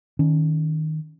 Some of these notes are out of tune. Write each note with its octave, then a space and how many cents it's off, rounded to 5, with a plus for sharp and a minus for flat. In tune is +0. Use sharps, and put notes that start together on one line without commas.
D#3 +5 C#4 +5